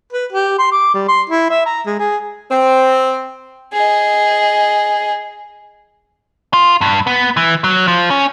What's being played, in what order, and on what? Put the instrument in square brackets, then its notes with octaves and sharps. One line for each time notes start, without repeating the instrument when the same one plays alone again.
[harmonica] B4
G4
C6
D6
G3
C6
E4
E5
A#5
G#3
G#4
[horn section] C4
[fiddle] G#4 D#5
[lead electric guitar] F4
G2
B3
E3
F#3
F3
C#4